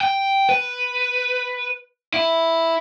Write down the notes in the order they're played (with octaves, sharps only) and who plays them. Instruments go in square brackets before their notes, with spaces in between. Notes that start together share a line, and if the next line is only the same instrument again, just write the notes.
[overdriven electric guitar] G5
B4
E4